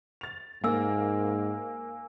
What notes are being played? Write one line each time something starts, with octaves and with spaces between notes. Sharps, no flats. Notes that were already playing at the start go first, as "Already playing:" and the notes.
A6 F7
G#2 A#3 G#5 E6